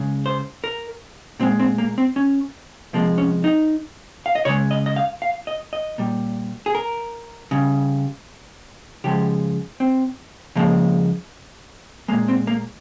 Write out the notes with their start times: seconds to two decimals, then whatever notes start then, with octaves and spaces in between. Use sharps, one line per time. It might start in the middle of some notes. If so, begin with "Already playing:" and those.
Already playing: C#3 G#3
0.26 C5
0.64 A#4
1.40 A#2 G#3 C4
1.60 C4
1.78 A#3
1.98 C4
2.16 C#4
2.93 C3 F3 G#3 A#3
3.18 C#4
3.44 D#4
4.26 F5
4.35 D#5
4.45 C#3 G#3 C#5
4.71 D#5
4.86 D#5
4.96 F5
5.22 F5
5.47 D#5
5.73 D#5
5.98 A#2 G3
6.66 G#4
6.75 A#4
7.51 C#3 G3
9.04 C#3 F3 G#3 G4
9.80 C4
10.56 C#3 F3 G#3 A#3
12.08 A#2 F3 G#3 A#3
12.28 C4
12.47 A#3